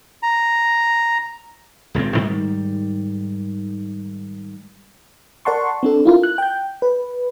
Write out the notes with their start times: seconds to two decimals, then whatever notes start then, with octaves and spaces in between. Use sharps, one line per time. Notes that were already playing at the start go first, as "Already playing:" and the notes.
0.23 A#5
1.94 D#1 C#2 G2 C4
2.16 G#2 D#3 G3
5.45 A#4 D5 F#5 A5 C6 C#6
5.83 C4 D4 A4
6.05 E4 F4 A#4
6.23 F#6
6.38 G5 G6
6.82 B4